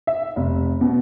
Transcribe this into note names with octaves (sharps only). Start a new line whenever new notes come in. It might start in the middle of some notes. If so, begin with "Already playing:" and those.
E5
F1
B2